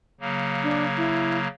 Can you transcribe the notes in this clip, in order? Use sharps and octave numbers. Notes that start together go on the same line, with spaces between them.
C#3 F#3 A#3
D4
E4